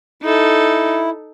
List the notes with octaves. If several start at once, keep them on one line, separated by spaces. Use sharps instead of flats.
D#4 E4 A4